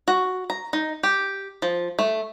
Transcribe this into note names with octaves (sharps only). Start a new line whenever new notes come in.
F#4
A#5
D#4
G4
F3
A3